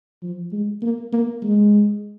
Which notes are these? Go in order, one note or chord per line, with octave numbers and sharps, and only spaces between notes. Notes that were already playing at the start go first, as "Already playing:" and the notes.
F3
G#3
A#3
A#3
G#3